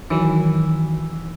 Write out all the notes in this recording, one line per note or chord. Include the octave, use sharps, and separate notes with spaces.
D#3 E3 F#3